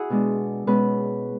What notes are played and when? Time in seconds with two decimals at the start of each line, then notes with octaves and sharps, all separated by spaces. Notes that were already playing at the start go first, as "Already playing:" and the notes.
Already playing: E4 F#4 G#4
0.10 B2 G#3 D4
0.67 B2 G#3 C#4 B4